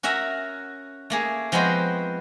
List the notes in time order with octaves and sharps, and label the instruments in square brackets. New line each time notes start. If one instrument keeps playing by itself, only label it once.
[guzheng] C#4 F#4 A#4 E5
A3 A#3 G#4
F3 G#3 B3 C4 F#4 C5